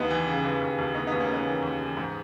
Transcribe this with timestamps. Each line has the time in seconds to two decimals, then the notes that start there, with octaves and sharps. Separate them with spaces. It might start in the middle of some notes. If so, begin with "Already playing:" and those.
Already playing: D#2 B3 D#4
0.10 E3
0.27 C#3
0.44 E3
0.61 D#2
0.78 D#2
0.95 D#2 B3 D#4
1.07 B3 D#4
1.12 D#2
1.20 A#3 C#4
1.29 C#3 B3 D#4
1.46 E3
1.62 D#2
1.80 E3
1.97 G#2